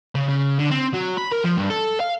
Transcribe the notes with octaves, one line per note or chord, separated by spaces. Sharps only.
C#3
C#3
D3
C4
F#3
B5
A#4
F3
G2
A4
F5